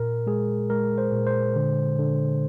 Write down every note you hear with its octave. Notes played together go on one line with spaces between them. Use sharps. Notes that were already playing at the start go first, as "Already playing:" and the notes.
Already playing: A#2 A#4
G#3 G#4
G#3 A#4
C5
A#2
C5
D3
D3